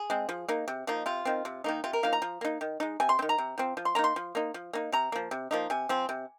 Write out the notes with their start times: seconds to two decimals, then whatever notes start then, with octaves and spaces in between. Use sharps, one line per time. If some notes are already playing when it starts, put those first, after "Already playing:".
Already playing: G#4
0.10 G#3 C4
0.29 F3
0.48 A#3 D#4
0.68 C3
0.87 F3 A#3 D#4
1.06 C3 F4
1.25 D#3 C4
1.45 C3
1.64 D#3 A#3 D#4
1.84 C3 F4
1.93 A#4
2.03 F3 A#3 D#4 F5
2.13 A#5
2.22 F3
2.41 A#3 D#4
2.61 D#3
2.80 G#3 D#4
3.00 C3 G#5
3.09 C6
3.19 C4
3.22 D#3
3.29 A#5
3.38 C3
3.58 F3 C4
3.77 F3
3.85 C6
3.95 A#3 D#4 A#5
4.04 C6
4.16 F3
4.35 A#3 D#4
4.54 F3
4.73 A#3 D#4
4.92 C3 A#5
5.12 F3 A#3
5.31 C3
5.51 F3 A#3 D#4
5.70 C3 G#5
5.89 F3 C4
6.09 C3